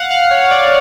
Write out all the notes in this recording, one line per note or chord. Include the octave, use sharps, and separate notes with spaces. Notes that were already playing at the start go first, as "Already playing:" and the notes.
Already playing: F5 F#5
F5
C#5
D5